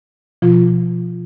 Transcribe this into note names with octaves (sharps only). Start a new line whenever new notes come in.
B2 F3 F4